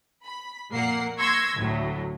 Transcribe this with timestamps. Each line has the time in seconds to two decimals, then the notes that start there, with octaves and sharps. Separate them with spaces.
0.24 B5
0.71 F2 A#2 A#3 A#4 F#5 C7
1.18 C6 C#6 E6 G#6 A#6
1.56 D2 A2 F#3